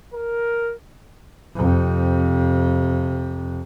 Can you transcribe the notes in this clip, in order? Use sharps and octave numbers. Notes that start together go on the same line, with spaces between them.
A#4
F2 C3